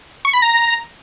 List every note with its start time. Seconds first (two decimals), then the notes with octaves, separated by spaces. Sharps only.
0.25 C#6
0.33 B5
0.42 A#5